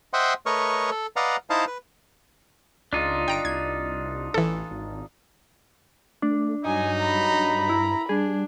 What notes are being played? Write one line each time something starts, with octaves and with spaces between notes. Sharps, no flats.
C5 D#5 E5 F#5 G5 C6
A3 A#4 B4 C#5 D#5 C#6
A4
B4 D5 D#5 F5 F#5 A#5
D#4 E4 C5 D#5 F5 A5
B4
C#2 D4 D#4 F4
G1 G5 A#5 D7
C2 G#6
A1 E3 A4
G#1
A3 D4
G2 F#3 D#4 G#5
A#5 B5
E4
G3 D4 G#4